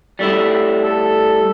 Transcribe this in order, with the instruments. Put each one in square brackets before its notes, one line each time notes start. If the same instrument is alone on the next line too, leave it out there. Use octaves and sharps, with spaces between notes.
[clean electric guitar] G3 A3 E4
[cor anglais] A4